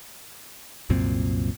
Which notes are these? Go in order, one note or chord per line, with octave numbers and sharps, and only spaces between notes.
C2 F#2 A#2 C4